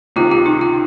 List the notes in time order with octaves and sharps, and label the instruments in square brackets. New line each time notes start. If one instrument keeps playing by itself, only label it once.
[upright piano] C#2 C3 D#3 [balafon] F4
[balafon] F4
D#4
F4